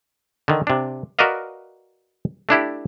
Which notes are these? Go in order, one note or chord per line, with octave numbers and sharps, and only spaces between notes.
D3 D#3
C3 D4
F#4 A#4 B4 D5 D#5 F5
A3 D4 E4 G4